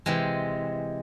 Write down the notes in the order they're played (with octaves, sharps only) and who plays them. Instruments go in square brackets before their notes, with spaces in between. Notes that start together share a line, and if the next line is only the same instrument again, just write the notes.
[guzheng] C3 E3 G#3 C4